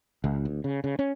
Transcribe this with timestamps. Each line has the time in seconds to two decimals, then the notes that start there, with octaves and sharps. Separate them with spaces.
0.24 C#2
0.45 D2
0.64 C#3
0.84 C#3
0.99 C#4